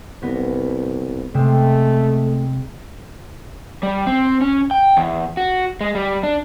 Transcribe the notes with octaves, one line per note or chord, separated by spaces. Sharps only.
C2 B3 A#6
C3 G#3 A3 C4
G3
C4
C#4
G5
E2
F#4
G#3
G3
D4